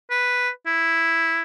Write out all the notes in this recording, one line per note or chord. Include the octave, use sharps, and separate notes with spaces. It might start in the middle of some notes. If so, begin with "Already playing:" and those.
B4
E4